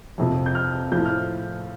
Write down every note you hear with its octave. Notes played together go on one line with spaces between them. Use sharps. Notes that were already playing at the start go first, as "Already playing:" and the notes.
F2 C3 F3
G6
F6
A2 F3 G6
F6